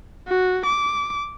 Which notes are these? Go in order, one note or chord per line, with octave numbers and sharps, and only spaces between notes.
F#4
D6